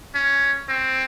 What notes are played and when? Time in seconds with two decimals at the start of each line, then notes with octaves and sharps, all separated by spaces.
0.15 C#4
0.69 C4